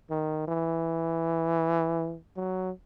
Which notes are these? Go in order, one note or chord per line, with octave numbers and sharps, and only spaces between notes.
D#3
E3
F#3